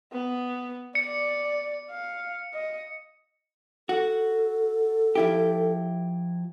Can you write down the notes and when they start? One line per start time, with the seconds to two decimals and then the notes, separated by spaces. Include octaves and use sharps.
0.12 B3
0.95 D5 C#7
1.90 F5
2.54 D#5
3.89 F#4 A4
5.15 F3 E4 G4